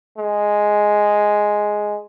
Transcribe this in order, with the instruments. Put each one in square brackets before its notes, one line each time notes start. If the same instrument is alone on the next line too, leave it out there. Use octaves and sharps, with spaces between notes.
[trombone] G#3